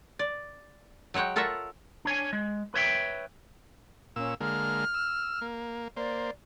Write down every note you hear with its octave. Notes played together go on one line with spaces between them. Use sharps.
D5
F#3 G#3 C#5 F#5 G5
F4 A4 A#4 C#5 E5 F#5
D4 C#5 G#5
G#3
B4 C#5 E5 G5
A#2 C#4 E6
D3 G#3 A#3 F6
E6
A#3
A#3 C5 D5